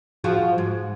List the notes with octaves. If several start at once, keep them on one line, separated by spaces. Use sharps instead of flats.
F3 G#3 F#4
G#2